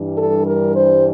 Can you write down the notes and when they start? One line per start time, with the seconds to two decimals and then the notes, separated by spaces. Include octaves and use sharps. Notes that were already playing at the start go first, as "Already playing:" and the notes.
Already playing: G2 E3 G3 D4
0.17 A4
0.45 A#4
0.75 C5